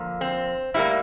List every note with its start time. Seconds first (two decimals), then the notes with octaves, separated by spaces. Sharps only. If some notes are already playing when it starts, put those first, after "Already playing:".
Already playing: D3 F3 A#3
0.21 C4
0.74 A2 G3 A#3 E4